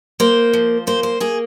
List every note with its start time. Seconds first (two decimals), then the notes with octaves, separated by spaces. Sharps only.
0.20 A#3 C5
0.53 F3
0.87 A#3 C5
1.03 C5
1.20 A#3 G#4